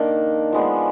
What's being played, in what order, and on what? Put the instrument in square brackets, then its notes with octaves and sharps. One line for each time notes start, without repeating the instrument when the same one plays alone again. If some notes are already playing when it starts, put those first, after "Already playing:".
Already playing: [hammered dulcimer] D#3 A#3 D4
F3 G#3 B3 D4